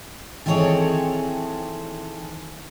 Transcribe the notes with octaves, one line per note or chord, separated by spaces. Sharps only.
D#3 E3 C4 G#4 A4 C#5